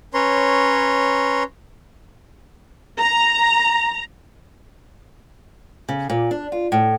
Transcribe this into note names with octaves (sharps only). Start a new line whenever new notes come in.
C#4 B4 C#5 A#5 C6
A#5
C#3
A#2
D4
F4
A2